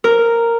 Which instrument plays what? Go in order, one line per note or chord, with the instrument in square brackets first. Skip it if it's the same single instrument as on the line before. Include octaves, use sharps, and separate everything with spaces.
[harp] A#4